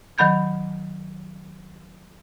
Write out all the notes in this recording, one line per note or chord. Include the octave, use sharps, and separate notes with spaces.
D#3 F#3 B5 G6 G#6